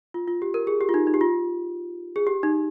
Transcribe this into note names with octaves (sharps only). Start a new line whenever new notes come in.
F4
F4
G4
A#4
G#4
G4
F4
D#4
D#4
G4
F4
G#4
G4
D#4